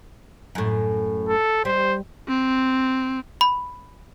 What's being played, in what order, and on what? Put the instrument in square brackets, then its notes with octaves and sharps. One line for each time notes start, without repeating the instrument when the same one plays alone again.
[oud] F#2 A2
[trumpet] A4
[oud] G3 [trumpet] C5
[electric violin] C4
[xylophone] B5